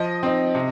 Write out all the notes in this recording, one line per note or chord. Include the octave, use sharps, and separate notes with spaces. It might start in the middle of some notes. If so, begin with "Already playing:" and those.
Already playing: F3 D#5
C4 D#4
C3